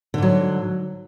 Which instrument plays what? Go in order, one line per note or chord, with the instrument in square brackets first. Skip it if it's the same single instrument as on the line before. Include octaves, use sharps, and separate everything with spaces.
[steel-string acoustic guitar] D3
G#2
F#3